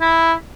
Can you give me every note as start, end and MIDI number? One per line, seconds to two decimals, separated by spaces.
0.01 0.33 64